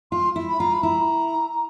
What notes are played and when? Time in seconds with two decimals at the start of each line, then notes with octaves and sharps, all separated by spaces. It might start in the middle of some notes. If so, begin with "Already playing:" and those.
0.12 F4 C6
0.36 E4
0.49 B5
0.60 F4 A#5
0.73 B5
0.83 E4 A#5